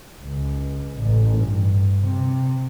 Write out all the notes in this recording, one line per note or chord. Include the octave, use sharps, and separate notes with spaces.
C#2
A1
G2
C3